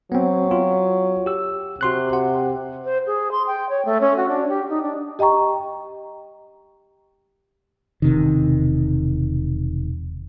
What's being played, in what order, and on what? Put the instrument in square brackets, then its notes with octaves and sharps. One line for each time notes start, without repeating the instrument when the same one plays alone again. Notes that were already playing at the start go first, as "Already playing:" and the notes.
[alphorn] F#3 [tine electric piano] B3 C4
[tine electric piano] F4
G4 E6
[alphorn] C3 [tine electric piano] F#4 C6 F#6
[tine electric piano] F#5
[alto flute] C5
G#4
C6
G5
C#5
A3
C#4
F#4
D4
G4
D#4
D4
[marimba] G4 D#5 G5 A#5 C#6
[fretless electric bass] E1 C3 D#3